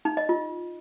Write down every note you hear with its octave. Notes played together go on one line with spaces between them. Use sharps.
D#4
D#5
F4